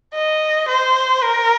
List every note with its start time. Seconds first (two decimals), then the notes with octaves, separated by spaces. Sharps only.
0.14 D#5
0.68 C5
1.22 A#4